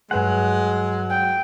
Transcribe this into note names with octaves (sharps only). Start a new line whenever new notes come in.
G2 F#3 G#3 B4 F#5 G#5
G5